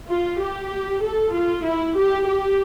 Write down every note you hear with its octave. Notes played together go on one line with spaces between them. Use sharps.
F4
G4
A4
F4
E4
G4
G4